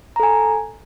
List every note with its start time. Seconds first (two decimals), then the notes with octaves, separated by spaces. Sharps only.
0.16 A#5
0.20 A4
0.23 G#5